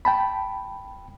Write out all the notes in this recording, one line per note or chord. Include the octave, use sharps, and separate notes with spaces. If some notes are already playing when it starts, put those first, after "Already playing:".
G5 A5 B5